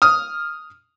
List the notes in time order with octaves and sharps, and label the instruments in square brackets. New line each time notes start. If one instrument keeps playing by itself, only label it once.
[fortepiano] D#6 F6